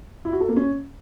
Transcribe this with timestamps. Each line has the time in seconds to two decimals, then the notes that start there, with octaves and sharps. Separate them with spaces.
0.25 E4
0.33 F#4
0.41 A4
0.49 A#3
0.56 C#4